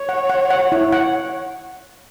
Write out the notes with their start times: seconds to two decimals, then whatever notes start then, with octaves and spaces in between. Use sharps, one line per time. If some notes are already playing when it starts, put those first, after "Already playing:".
Already playing: C#5
0.09 F#5
0.30 F#5
0.51 F#5
0.72 E4
0.92 F#5